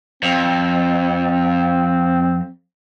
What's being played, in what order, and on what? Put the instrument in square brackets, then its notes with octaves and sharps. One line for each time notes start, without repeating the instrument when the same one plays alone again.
[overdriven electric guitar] F2 [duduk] C4